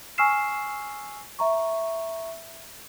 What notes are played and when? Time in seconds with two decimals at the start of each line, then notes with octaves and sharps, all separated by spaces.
0.18 G#5 C#6 E6 F6 C7 E7
1.39 E5 A#5 C#6